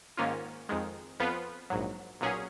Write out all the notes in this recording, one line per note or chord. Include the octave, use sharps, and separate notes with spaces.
G#2 D#3 A#3 C#4 F4
F2 D#3 G#3
F2 F3 B3 F4 B4
A#1 G#2 F#3
B1 A#2 F#3 C#4 G#4